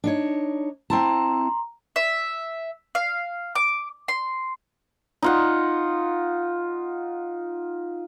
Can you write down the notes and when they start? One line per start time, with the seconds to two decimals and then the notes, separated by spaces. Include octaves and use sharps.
0.04 D4 D#4 C#5
0.90 C4 E4 A5 A#5 C6
1.96 E5
2.95 F5
3.55 D6
4.08 C6
5.22 D#4 F4 F#5